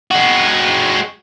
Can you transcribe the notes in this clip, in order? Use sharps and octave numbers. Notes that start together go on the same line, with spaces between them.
G#3 F#4